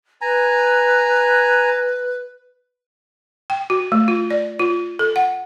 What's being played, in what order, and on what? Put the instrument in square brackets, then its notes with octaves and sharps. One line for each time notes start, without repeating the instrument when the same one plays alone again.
[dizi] B4 [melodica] G#5 A#5
[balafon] G5
F#4
A3
F4
D5
F4
A4
F#5